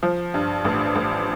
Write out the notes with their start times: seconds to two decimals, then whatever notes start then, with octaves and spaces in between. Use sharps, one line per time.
0.03 F3
0.34 G2
0.65 A1
0.95 A1